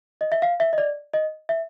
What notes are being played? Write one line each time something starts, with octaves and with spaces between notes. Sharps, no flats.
D#5
E5
F5
E5
D#5
D5
D#5
E5